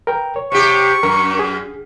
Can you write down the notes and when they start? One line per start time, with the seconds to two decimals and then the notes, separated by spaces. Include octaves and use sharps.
0.07 A#4 B4 G5
0.36 C#5
0.52 C3 G4 C#6
1.03 F#2 A#4
1.39 G#4